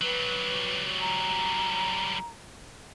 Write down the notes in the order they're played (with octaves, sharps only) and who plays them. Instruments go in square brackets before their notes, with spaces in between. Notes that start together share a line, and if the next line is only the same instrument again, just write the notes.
[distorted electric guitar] F#3 G3 [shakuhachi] B4
[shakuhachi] A#5